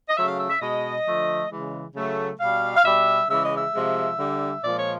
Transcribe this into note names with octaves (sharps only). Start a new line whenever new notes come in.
D#5
C#3 F#3 A3 E5
F5
E5
E5
B2 G#3 D#5
D3 F3 A3
C#3 E3 G#3
C#3 F#3 A3
B2 G3 F5
F5
B2 G3 E5
C#3 E3 G#3 E5
D#5
E5
C3 F3 G#3
D3 G3
A#2 F3 G#3 D5
C#5